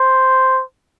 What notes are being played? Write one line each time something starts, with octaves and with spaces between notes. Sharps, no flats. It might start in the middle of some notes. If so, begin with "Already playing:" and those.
Already playing: C5